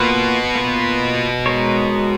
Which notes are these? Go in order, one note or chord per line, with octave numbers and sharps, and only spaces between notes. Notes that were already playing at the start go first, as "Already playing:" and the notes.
Already playing: B2 A#3 F4 B4
A#3 F4 B4
G#3 D#4 A#4 C#5